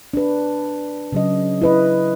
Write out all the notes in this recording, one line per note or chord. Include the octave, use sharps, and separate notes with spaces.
D4 B4
C#3 F#3 D#5
E4 B4 D#5